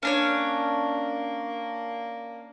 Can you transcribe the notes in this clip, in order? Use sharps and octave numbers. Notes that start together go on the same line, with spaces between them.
A#3 C#4 D4 C#5